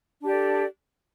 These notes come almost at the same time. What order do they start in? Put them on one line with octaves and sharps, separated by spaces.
D4 G4 D5 A4